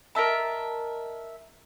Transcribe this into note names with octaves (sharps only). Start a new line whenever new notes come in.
A#4 D#5 E5 A5